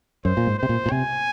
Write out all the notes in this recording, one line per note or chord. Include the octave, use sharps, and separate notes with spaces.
F#2 C5
A#2
G#2
C3 C5
A#2
A#2
C3 G#5